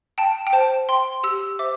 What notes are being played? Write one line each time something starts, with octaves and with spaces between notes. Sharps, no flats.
G5 A5
G5
C5 A5
G5 C6
G4 E6
C5 E5 D6